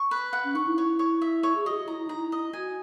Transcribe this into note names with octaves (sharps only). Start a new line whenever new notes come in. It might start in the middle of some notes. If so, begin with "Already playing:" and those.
Already playing: C#6
B4
F#5
C#4
D#4 C#6
E4
C#5
C#5
E5
C#5
G#4
F#4 D#5
G#4
F#4
E4 A#5
E4
D#4 A#5
E4
D#5
F#4 G#5